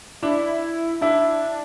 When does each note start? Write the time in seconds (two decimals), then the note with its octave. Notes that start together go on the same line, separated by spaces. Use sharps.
0.22 D4 E4
1.01 D4 E4